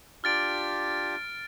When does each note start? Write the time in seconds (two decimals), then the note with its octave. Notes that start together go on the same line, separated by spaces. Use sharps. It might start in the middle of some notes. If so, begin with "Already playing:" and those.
0.24 D4 F4 G4 F6 A6 D7